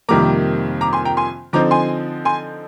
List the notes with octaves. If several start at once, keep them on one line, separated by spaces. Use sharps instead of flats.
F2 C3 D#3 G3 A#3 A#5 D6
A#5 D6
G#5 C6
G5 A#5
G#5 C6
D3 F3 C4 D#4 A#5 D6
G#5 C6
G#5 C6